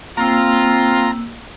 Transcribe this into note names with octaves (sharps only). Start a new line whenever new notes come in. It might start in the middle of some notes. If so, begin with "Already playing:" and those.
A#3 C4 F4 A#5 E6